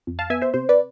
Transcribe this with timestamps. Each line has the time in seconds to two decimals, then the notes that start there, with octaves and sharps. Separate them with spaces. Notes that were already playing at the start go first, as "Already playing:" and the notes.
0.07 F2
0.19 F5 A5
0.30 B3 E5 G#5
0.42 C5 E5
0.54 C3 C5
0.69 B4 D5